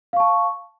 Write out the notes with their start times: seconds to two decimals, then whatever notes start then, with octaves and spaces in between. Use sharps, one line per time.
0.13 F5
0.16 C#6
0.20 A5